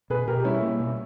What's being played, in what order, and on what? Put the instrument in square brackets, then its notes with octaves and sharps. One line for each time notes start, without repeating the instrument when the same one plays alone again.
[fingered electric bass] B2 [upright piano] G#4 B4
[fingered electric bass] B2 [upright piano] G4 A#4
[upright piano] G4
[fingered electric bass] G3 [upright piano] C#4 E4
[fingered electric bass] A#3
B2